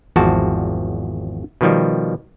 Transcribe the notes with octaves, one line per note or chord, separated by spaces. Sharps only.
G#1 E2 F3 F#4 A5
B2 D#3 F3 G3